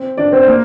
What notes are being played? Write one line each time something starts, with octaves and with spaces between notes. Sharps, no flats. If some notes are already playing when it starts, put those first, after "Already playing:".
Already playing: C4
D4 D5
C4 C5
A#3 A#4